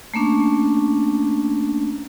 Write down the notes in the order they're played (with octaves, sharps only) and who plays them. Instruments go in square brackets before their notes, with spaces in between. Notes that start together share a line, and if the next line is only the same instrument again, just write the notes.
[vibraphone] A3 A#3 C#4 D4